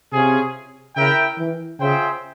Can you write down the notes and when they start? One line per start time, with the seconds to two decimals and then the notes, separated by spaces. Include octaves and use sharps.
0.12 C3 C#4 F4 G#4
0.97 C#3 E4 A#4 E5 G5
1.38 E3
1.80 C#3 F4 G#4 C5 E5 G5